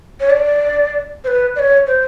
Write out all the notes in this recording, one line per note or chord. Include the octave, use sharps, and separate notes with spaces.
C#5
D5
C5
B4
D5
C#5
C5